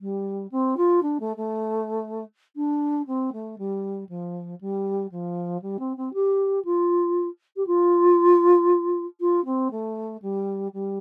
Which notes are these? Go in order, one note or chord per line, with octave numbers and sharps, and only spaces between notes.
G3
C4
F4
D4
A3
A3
D4
C4
A3
G3
F3
G3
F3
G3
C4
C4
G4
F4
G4
F4
F4
C4
A3
G3
G3